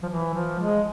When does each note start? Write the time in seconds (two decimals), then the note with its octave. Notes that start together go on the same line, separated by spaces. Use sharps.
0.03 F3
0.09 E3
0.34 F3
0.60 G#3